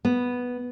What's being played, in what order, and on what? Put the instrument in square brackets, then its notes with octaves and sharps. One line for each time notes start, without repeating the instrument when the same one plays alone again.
[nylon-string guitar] B3